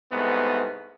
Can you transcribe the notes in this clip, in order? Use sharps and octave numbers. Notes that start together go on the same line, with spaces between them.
C2 G#2 A3 B3